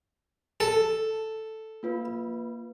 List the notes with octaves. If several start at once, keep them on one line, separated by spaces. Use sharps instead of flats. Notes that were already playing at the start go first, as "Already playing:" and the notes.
A4
A#3 F4 B4